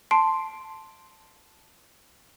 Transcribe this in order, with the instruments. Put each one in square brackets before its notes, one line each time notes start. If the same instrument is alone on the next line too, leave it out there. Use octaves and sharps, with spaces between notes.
[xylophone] A5 C6 C7 D7